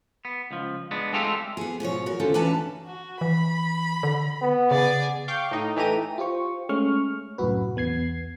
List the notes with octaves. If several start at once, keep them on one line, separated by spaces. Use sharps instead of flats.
B3
C#2 F3
G#3 B3 D4
G#3 A3 C4 F4 G4 A4
B3 G#4
G#2 B2 F3 C#5
F#4 A#4
D#2 D3 C#4 F4 A4 C5
E3 C#4 D4 B4 A5 A#5
F#4
E3 B5
D3
B3
C#3 G#4 D5
F5 G5 C#6 D6 G6
A2 D#4
E3 A3 G4 A#5 D#7
F4 G4 C5 C#6
G#3 A3 C#4 C#6 F6
C2 F#2 A2 F#4 B4
B1 E2 B3 G#6 C7